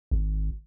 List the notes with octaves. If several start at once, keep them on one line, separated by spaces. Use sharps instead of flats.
G#1